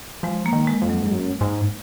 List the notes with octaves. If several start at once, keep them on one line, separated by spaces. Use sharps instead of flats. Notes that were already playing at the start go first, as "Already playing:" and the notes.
F3 G#3
A#3
D#3
G#3
F2
F#3
G#2
F#2
G#2